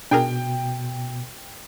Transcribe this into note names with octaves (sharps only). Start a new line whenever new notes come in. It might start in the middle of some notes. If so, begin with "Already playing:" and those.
B2 D4 G#4 A#4 G5